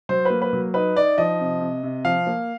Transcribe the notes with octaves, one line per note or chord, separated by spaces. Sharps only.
F#3 C5
A#3 B4
B4
F#3
D#4 B4
D#4 D5
F3 D#5
C3
C3
C3
F3 F5
A#3